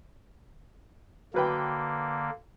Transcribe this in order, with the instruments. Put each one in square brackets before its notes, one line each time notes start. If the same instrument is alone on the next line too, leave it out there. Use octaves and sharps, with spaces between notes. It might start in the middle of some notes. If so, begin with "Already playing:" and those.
[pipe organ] D3 A#3 [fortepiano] F#3 B4 G5